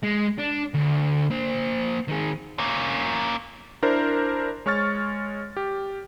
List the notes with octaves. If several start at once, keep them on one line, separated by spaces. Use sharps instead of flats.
G#3
D4
D2
A#3 C5
D#3 G#4
A#3 C#4
D4 E4 A#4 C5
G#3 C#5 C#6 F6 A6
G4